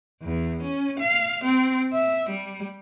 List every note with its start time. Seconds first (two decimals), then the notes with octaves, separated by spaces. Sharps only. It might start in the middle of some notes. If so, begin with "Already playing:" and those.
0.22 E2
0.63 C#4
1.00 F5
1.44 C4
1.93 E5
2.30 G3